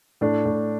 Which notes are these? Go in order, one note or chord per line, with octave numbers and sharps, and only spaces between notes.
A2 D4
A2